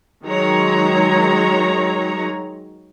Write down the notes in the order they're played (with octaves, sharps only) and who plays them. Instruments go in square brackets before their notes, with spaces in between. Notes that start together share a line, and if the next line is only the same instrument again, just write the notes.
[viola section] D#3 F#3 G#3 C#5 A#5